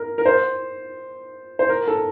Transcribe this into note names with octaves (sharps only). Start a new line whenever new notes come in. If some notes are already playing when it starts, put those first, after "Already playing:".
Already playing: A#4
A#4
C5
C5
A#4
A4